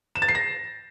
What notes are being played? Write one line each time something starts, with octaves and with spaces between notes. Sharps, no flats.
E7
A6
C7
A#6